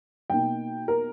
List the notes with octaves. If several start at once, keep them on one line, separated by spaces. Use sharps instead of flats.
B2 A#3 D#4 G5
A#4